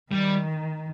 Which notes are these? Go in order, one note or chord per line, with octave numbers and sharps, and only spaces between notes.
D#3 G3